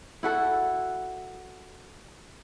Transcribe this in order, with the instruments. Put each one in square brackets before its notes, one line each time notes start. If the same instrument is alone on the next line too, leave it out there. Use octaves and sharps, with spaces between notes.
[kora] E4 F#4 A4